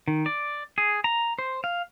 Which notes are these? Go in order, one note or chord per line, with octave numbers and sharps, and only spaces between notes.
D#3
D5
G#4
A#5
C5
F5